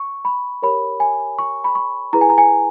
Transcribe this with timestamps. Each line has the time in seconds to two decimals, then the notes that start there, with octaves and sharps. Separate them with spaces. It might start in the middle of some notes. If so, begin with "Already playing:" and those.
Already playing: C#6
0.25 B5
0.62 G4 A#4 C#5 B5
1.00 G#5
1.39 C#6
1.64 B5
1.75 C#6
2.13 E4 G#4 B4 A#5
2.21 G#5
2.30 A#5
2.38 G#5